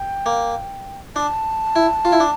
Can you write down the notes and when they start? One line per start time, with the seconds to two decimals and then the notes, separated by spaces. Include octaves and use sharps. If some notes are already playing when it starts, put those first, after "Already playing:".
Already playing: G5
0.26 A#3
1.16 D4 A5
1.76 E4
2.05 F4
2.12 E4
2.20 D4